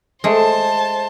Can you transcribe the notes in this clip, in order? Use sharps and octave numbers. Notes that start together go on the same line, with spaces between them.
G#3 A3 C5 A5